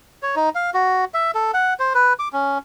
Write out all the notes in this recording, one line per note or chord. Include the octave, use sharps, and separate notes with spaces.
C#5
D#4
F5
F#4
E5
A4
F#5
C5
B4
D6
C#4